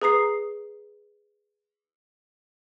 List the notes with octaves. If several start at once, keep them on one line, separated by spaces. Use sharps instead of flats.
G#4 B4 A#5 D#6 C7